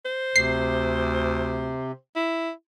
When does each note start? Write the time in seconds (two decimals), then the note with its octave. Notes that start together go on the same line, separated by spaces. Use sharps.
0.05 C5
0.36 D2 C3 C7
2.16 E4